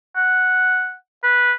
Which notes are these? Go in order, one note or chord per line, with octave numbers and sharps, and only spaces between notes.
F#5
B4